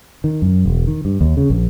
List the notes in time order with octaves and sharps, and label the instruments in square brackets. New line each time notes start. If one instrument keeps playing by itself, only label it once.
[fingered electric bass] D#3
F#2
E1
D#3
G2
D#2
C#3
A#1